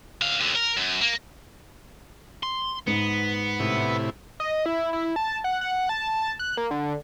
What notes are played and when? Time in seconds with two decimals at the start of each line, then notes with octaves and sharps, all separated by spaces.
0.21 D3 F5
0.42 D#2 D3
0.55 A#4
0.77 F#2
1.01 A#3
2.43 C6
2.87 G#2 B3
3.60 A2 C3 E4
4.40 D#5
4.66 E4
4.93 E4
5.16 A5
5.44 F#5
5.61 F#5
5.89 A5
6.39 F#6
6.57 A#3
6.71 D3